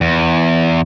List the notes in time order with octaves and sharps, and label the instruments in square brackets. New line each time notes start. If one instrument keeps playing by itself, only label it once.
[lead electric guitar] E2